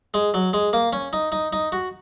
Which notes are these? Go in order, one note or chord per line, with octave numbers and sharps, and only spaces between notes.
G#3
F#3
G#3
A#3
C#4
D#4
D#4
D#4
F#4